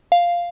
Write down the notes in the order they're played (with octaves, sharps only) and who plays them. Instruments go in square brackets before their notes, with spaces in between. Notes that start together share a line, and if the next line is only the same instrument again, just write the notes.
[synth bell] F5